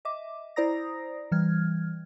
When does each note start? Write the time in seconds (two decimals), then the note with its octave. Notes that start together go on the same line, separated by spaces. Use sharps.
0.05 D#5 E5 D6
0.56 E4 C5 D5 A#5 D#6 A#6
1.32 E3 G3 F6 G#6